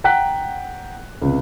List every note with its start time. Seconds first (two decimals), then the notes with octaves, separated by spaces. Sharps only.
0.04 F#5 G5 A#5 F#6 B6
1.22 C#2 C3